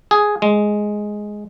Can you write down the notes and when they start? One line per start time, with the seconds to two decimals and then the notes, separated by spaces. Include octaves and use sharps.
0.11 G#4
0.42 G#3